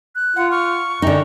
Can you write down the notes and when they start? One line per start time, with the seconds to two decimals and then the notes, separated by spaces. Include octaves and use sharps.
0.15 F#6
0.36 F4 F#5
0.51 C#6 F6
1.02 F#2 D3 D#4 G5